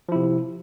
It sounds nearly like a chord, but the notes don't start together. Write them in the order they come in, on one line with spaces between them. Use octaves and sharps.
F3 E4 C3